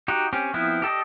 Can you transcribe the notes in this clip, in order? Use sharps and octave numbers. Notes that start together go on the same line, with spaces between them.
D#4 F#4 G4
C4 C#4 G4
F3 B3 C4 E4
G4 A4 D5 D#5